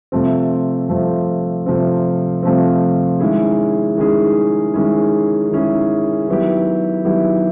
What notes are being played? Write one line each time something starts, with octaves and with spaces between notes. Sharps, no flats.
C3 F3 A3 C4
C3 F3 A3 C4
C3 F3 A3 C4
C3 F3 A3 C4
D#3 G#3 C#4 E4 G#4
D#3 G#3 C#4 E4 G#4
D#3 G#3 C#4 E4 G#4
D#3 G#3 C#4 E4 G#4
D#3 F#3 B3 E4 G4
D#3 F#3 B3 E4 G4